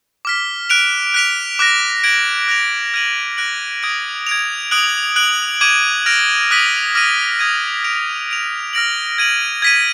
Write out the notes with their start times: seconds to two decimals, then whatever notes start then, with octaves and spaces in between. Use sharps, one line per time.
0.25 D6 F6 B6
0.70 F#6 D7 F7
1.14 F#6 B6 D7 F7
1.59 D6 F#6 A#6
2.04 G#6 D7 F#7
2.48 F#6 A#6 F7
2.94 F6 G#6 D#7 F#7
3.37 F#6 A#6 D7 F#7
3.83 D#6 G#6 D7
4.27 G#6 D7 F7
4.71 D#6 F#6 D7 F#7
5.16 F#6 D7 F#7
5.61 D6 G#6 D#7 F#7
6.06 F6 A#6 D7 F7
6.51 D#6 F#6 B6 D#7 F#7
6.95 D6 F6 A#6 D#7 F#7
7.39 D#6 G#6 D#7
7.84 G#6 D7 F7
8.29 G#6 D7 F7
8.73 F6 A#6 D7 F#7
9.18 G#6 D#7 F#7
9.62 G#6 B6 D#7